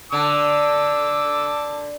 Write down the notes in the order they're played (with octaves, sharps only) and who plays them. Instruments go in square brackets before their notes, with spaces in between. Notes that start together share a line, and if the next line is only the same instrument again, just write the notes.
[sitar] D3 [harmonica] A5 D6 E6